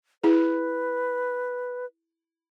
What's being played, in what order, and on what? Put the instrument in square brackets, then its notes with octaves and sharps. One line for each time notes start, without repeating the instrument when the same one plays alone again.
[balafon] E4 G#4 [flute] B4